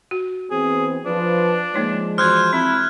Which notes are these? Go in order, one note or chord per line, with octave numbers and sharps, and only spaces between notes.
F#4
E3 B3 C4 G#4
F3 D4 B4
F3 G#3 A#3 D#4 C#5
E3 F#4 C5 F6 F#6 G#6
C4 E4